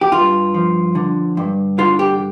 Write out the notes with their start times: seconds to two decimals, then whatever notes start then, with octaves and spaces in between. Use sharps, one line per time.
0.01 G4
0.12 G2 F4
0.54 F3
0.95 D3
1.37 G2
1.78 D3 F4
1.99 G4